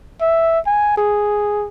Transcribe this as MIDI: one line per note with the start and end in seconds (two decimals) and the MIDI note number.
0.21 0.60 76
0.67 0.94 80
0.98 1.68 68